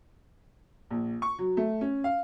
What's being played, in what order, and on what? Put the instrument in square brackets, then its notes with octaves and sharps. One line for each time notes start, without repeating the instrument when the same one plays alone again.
[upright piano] A#1
C#6
F#3
A3
C#4
F5